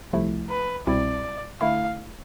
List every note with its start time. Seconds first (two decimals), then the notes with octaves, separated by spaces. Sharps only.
0.13 C2 C3 F3 A3 E4
0.49 B4
0.87 C2 B2 G3 C4 E4 D5
1.61 D3 A3 E4 F5